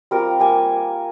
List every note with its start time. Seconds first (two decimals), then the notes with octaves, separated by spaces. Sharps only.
0.11 G3 C4 F4 A#4
0.40 G3 A#3 G#5